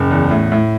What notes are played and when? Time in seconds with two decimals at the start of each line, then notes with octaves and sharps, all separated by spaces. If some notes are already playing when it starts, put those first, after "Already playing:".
Already playing: F#1
0.10 E2
0.31 A2
0.52 A2